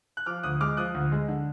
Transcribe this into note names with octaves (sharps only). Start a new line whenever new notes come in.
F#6
F3 D6 F6
D2 D#6 F#6
G#3 D6 F6
F3 D#6 F#6
D2
G#3
D3